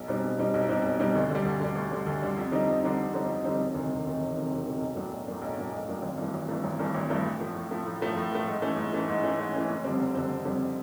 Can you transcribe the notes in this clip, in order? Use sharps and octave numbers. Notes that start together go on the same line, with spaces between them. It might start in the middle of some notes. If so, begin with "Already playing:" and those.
Already playing: B1
B2 G3 C4 D#4
B1
B2 G3 C4 D#4
B1
B2 G3 C4 D#4
B1
B2 G3 C4 D#4
D2
D3
G3
D2
D3 G3
D2
D3 G3
D2
D3 G3
F2
D3 G3 C4 D#4
F2
D3 G3 C4 D#4
F2
D3 G3 C4 D#4
F2
D3 G3 C4 D#4
E1
D2 C3 D#3
E1
D2 C3 D#3
E1
D2 C3 D#3
E1
D2 C3 D#3
B1
A2 F#3 A#3 D4
B1
A2 F#3 A#3 D4
B1
A2 F#3 A#3 D4
B1
A2 F#3 A#3 D4
G#1
G2 E3 A3
G#1
G2 E3 A3
G#1
G2 E3 A3
G#1
G2 E3 A3
A2
F3 A3
A2
F3 A3
A2
F3 A3
A2
F3 A3
G#2
E3 A3 C#4
G#2
E3 A3 C#4
G#2
E3 A3 C#4
G#2
E3 A3 C#4
F#1
F2 D3 G3 C4
F#1
F2 D3 G3 C4
F#1
F2 D3 G3 C4